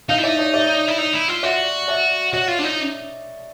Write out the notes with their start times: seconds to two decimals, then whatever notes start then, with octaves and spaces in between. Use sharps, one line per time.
0.09 D#4 D#5 F5
0.18 E4
0.23 D5 E5
0.27 D#4
0.39 C#5 D#5
0.54 D5 E5
0.88 E4
0.98 D#4
1.14 E4
1.29 F4
1.43 F#4 D5 E5
1.88 D5 E5
2.33 F#4 C#5 D#5
2.48 F4
2.59 D4
2.64 D#4